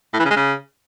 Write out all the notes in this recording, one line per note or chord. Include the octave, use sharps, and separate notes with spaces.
A2
E3
C#3
G#3
C#3